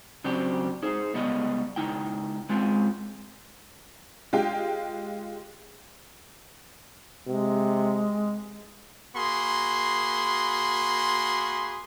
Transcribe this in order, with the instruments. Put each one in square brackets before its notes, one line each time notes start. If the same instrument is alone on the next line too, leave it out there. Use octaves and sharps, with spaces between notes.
[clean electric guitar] C#3 F#3 C4 D4 G4
D#4 G#4 C5
C#2 G3 B3 C#5 D#5
C#2 D#4 E4 G5
G#3 C4 C#4 F4
[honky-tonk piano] G#3 F4 G4 G5
[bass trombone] C3 [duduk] G#3
[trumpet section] A#3 F#4 G#4 B5 C6